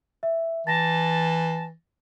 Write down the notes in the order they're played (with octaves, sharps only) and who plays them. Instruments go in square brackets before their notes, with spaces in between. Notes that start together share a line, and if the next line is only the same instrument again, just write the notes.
[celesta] E5
[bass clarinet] E3 [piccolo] A5 [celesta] A6 A#6